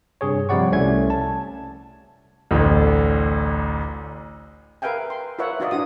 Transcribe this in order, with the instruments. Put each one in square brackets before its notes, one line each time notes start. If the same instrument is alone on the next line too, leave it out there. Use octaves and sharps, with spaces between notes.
[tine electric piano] G2 C3 G#4 C#5
C3 F3 G3 D5 F#5 C#6
C2 A3 C#4 E5 G#6
A5
[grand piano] A1 D2
[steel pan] A#4 B4 E5 F5 G5 G#5
C6
F4 A#4 B4 C#5 E5 F#5
D#4 F4 F#4 D5 D#5
D4 E4 F#4 D#6